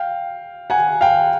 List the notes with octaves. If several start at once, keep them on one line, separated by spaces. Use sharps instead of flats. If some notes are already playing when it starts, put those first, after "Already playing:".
Already playing: F5 G5
F#5 G#5
F5 G5